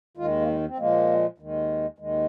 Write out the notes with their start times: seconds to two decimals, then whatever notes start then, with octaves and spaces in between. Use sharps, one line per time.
0.17 D#2 D#3 G#3 F4
0.41 A#3
0.47 G#3
0.67 C4
0.78 A#2 F3 G#3 A#3
1.38 D#2 D#3 G#3
1.98 D#2 D#3 G#3